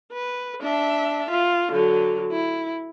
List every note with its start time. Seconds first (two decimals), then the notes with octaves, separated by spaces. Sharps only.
0.13 B4
0.62 D4 E5
1.30 F4
1.72 D3 F#3
2.32 E4